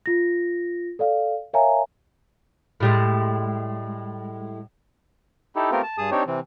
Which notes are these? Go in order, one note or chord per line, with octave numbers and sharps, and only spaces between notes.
F4 A#6
A4 D5 F5
A#4 C#5 E5 F5 G#5 A#5
A2 G3 G#3
D#4 E4 G4 A4
A3 B3 C4 F4 G4 A#4
A5
G2 G#4 A5 D#6
C4 D4 D#4 G4 C#5
C3 E3 C4